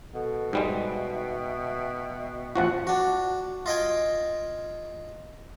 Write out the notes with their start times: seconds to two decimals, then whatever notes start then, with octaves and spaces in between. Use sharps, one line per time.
0.14 B2 A4 F#5
0.53 G#2 G3 G#3 E5 G5
2.56 A1 F3 F4 F#4 F#5
2.87 D4 F#4
3.66 F4 D#5 G5 G#5